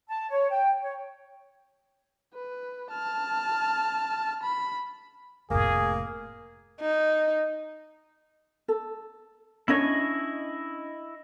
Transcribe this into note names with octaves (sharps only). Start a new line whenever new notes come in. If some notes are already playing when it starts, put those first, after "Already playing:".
A5
C#5
G5
C#5
B4
A5 F6
B5
F1 A2 A#3 G#4
D#4
A4
C#4 D4 E4 C#5 D#5 C#6